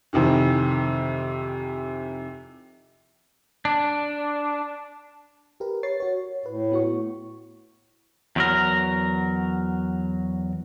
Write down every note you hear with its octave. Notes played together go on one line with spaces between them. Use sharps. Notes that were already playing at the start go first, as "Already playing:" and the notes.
F2 C3 D#3 E3
D4
G4 A#4 B4
C#5 A6 C7
F#4 C#5
A2 B4
B3 F#4 C#6
E2 F#3 A#4